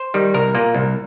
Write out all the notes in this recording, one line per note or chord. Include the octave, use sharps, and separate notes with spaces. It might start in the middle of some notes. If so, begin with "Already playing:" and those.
Already playing: C5
D#3 G3
C2 A#4
A#2 A#3
C2